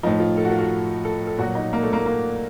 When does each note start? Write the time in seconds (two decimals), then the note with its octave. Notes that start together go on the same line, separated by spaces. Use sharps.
0.03 A2 F3 D#4
0.20 F4
0.37 A4
0.45 F#4
0.51 F4
0.58 F#4
1.05 A4
1.27 A4
1.38 A#2 F#3 F#4
1.55 D#4
1.73 A#3
1.83 A3
1.93 A#3
2.06 A#3